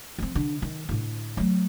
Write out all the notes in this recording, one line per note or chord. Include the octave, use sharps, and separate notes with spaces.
F3 C4
D3
D#3
A2 D3
F#3 A3